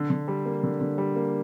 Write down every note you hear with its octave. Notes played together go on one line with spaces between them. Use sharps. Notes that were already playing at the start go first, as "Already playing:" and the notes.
Already playing: D3
D3
G3
A#3
D3
D3
G3
A#3